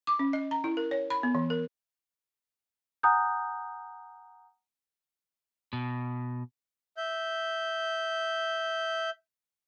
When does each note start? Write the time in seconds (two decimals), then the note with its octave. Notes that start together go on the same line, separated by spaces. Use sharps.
0.07 D6
0.19 C#4
0.33 D#5
0.51 A#5
0.64 E4
0.77 A#4
0.91 C#5
1.10 B5
1.23 B3
1.35 E3
1.50 A#4
3.03 F#5 G#5 A#5 D#6 F#6 G6
5.73 B2
6.97 E5 G6